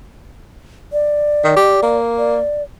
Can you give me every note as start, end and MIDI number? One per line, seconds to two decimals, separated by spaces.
0.93 1.97 74
1.44 1.55 51
1.56 1.81 67
1.83 2.40 58
2.18 2.62 74